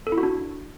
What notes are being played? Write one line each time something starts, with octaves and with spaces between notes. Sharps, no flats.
A4
E4
F#4
D4